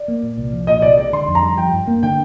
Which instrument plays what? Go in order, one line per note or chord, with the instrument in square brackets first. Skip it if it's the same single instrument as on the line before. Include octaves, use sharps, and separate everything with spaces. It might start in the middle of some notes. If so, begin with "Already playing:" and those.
Already playing: [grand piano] D5
[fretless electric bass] A#3
A#2
C2
F3
[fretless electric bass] A#2 [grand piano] D#5
[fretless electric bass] C2 [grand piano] D5
[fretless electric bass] G#3 [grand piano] D5
[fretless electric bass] D3 [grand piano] C6
[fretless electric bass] F2
[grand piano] A#5
[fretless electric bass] G3
[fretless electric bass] F3 [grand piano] G5
[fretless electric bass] G2
A#3
[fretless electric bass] D3 [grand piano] G5